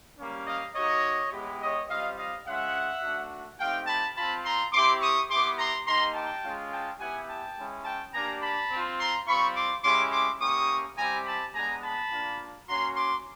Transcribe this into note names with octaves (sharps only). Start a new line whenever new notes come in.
G3 A#3 C#4
D#5 F5
A#3 D#4 F#4 C#5 D#5
G#3 B3 E4 G4
C#5 D#5
G3 C4 F4 D#5 F5
D#5 F5
G#3 C#4 F4 E5 F#5
A3 D4 F#4
A3 C4 D#4 G4 F5 G5
A5 B5
C4 F4 A5 B5
A#5 C6
C4 E4 G4 C6 D6
C#6 D#6
B3 E4 G4 C6 D6
A#5 C6
A#3 D#4 G4 A#5 C6
G5 A5
G#3 C#4 F4
G5 A5
B3 E4 G4 F#5 G#5
G5 A5
G#3 C#4 E4
G5 A5
A#3 D4 G4 G#5 A#5
A5 B5
C4 F4
A#5 C6
G3 C4 F4 B5 C#6
C6 D6
G#3 C#4 E4 G4 C6 D6
C6 D6
A#3 C#4 E4 G4 C#6 D#6
G3 C4 E4 G4 G#5 A#5
A5 B5
G#3 B3 D4 G#5 A#5
A5 B5
A#3 D4 F4
A#3 C#4 F#4 A#5 C6
C6 D6